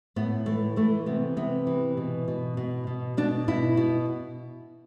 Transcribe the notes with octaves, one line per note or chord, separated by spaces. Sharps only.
A2 B3
E3 A3
E3 A3
C3 B3
C3 B3
E3
B2
B2
B2
B2
B2 D4
B2 E4
B2